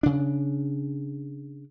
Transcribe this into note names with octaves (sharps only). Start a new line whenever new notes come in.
C#3 D4